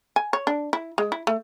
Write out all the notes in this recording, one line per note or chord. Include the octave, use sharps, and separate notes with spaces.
G#5
C#5
D4
E4
G#3
E4
A3